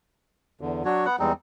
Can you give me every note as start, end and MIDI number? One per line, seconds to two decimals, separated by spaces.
0.61 0.83 40
0.61 0.83 50
0.85 1.06 54
0.85 1.06 62
0.85 1.06 66
0.85 1.04 73
1.06 1.16 59
1.06 1.16 78
1.19 1.32 40
1.19 1.32 55
1.19 1.32 56
1.19 1.33 60
1.19 1.33 63